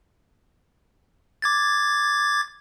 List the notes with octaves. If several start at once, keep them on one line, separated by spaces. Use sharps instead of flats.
D6 G#6 A6